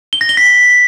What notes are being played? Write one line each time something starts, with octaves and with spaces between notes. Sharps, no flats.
G7
A#6
G7
B6